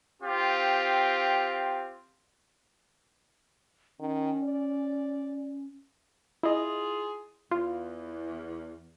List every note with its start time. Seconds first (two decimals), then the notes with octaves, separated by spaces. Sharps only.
0.21 C4 F4 G4
4.00 D#3 C#4
4.44 D5
6.43 E4 F4 G#4 D#5
7.51 E2 F4